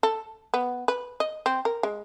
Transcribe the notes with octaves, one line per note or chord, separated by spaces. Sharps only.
A4
B3
B4
D#5
C4
A#4
G#3